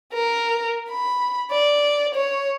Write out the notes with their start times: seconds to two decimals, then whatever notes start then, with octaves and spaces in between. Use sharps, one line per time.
0.14 A#4
0.91 B5
1.52 D5
2.15 C#5